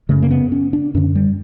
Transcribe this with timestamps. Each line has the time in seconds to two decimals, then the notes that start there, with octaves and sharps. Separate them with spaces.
0.09 F#2 C#3 A3
0.22 A#3
0.31 B3
0.52 C#4
0.73 D4
0.94 F#2 D3 C#4
1.15 G3